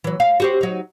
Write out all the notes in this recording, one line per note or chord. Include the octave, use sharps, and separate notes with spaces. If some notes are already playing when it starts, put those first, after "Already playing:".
E3 F#3
F5
F#4 G4 C5
F#3 D#4